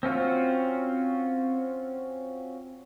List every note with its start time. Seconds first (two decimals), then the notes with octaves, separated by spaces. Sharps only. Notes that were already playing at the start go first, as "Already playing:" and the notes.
0.03 C4 C#4 F4 F#4